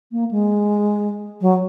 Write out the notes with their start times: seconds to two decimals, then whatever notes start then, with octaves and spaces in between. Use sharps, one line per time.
0.12 A#3
0.31 G#3
1.41 F#3